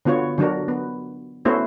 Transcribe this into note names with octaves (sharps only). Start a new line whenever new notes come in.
D3 B3 F4 F#4 C#5
D3 F#3 D4 F#4 A#4
B3
A3 B3 C#4 E4 F#4 C5